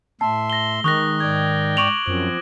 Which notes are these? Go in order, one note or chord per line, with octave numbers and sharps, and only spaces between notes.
A2 E5 A5 C6
A#6 G7
D#3 G#3 C#6 D#6 F#6 A#6
G#2 D5 G5 G#6
C#6 D6 D7 F7 F#7
F#2 F3 C4